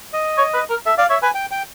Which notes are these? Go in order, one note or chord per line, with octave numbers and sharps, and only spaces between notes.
D#5
C#5
B4
A#4
A4 E5
D5 F5
C#5 E5
B4 G#5
G5
G5